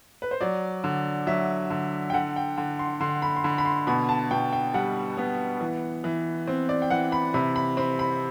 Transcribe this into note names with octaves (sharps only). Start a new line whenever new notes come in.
B4
C5
F#3 D5
D3
F#3 E5
D3
G5
D3 F#5
G5
D3
C6
D3 C6
B5
C6
D3 B5
B5
C6
B2 B5
A5
B2 G5
G5
G3 F#5
B3
E3
E3
C4
D5
G5
E3 F#5
B5
C3 B5
B5
C4 B5
B5